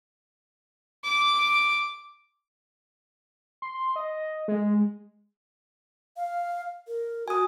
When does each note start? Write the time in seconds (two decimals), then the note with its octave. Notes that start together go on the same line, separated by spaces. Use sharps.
1.04 D6
3.62 C6
3.96 D#5
4.48 G#3
6.17 F5
6.88 A#4
7.28 F#4 G#5 D#6